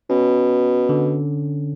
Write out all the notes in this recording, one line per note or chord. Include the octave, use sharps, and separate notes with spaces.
B2 C#4
D3